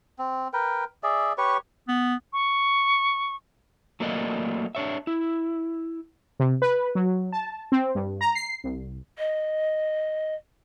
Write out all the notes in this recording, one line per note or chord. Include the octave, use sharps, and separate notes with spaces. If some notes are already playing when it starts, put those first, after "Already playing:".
C4
A#4 B4 G5
G#4 D5 E5
G4 B4 C#5 C#6
B3
C#6
F#3 A3 A#3 A#4 D5 D#5
D4 C#5 E5
E4
C3
B4
F#3
A5
C4
G2
A#5
C7
C2
D#5